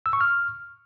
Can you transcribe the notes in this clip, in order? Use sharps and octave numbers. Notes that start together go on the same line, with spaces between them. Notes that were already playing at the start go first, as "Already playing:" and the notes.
E6
C#6
F6